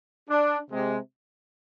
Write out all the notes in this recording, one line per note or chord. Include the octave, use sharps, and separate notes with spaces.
D4
C3 G#3